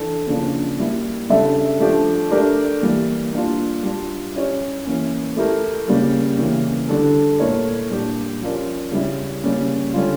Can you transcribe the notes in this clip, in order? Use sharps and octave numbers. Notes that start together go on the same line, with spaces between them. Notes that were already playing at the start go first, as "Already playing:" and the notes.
Already playing: E3 D4 A4
C#3 F3 A#3 D4
G3 A#3 E4
C#3 G3 D4 A4 E5
F3 A3 D4 G4
A3 D4 G4 A#4 D5
E3 G3 A#3
A#3 D4 F4
G3 D4 F4
C#4 E4 G4 C#5
E3 A#3 C#4
A3 E4 G4 A#4
C#3 G3 A#3
C#3 E3 A#3
D3 G3 D4 A4
A#2 A3 E4 A#4 C#5
A#2 G3 D4 G4 D5
F3 C#4 F4 A#4 D5
C#3 G3 C#4 E4
C#3 G3 A#3 C#4
D3 G3 C#4 F4